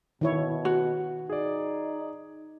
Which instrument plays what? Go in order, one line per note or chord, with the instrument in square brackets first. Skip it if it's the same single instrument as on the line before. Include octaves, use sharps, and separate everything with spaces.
[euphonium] B2 [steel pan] D#3 E4 C#5
[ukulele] F#4
[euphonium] D#4 [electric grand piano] G#4 D5